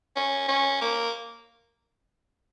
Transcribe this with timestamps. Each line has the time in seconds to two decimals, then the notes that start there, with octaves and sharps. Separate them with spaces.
0.16 C#4
0.48 C#4
0.81 A#3